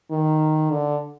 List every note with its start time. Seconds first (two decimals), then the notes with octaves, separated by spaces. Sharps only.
0.11 D#3
0.71 D3